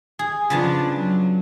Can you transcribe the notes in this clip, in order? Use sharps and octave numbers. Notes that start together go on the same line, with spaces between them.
G#4
C#3 F3 B3 D4 A5
F#3